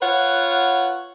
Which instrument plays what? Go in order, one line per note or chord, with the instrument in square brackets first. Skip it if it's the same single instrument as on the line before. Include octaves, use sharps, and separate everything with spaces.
[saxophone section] F4 B4 C#5 F#5